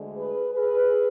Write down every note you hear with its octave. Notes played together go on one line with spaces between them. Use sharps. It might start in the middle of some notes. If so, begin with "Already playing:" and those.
Already playing: D2 D3 G#3
G#4 B4
G#4 B4